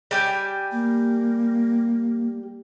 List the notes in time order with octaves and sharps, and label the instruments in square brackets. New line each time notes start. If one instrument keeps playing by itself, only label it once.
[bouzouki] G3 G4 G#5
[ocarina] A#3